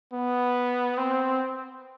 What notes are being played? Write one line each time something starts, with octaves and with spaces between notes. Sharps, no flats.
B3
C4